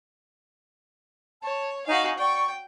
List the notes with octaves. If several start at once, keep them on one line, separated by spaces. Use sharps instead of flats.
C#5 A5
D#4 F#4 F5 G#5
D5 G5 C#6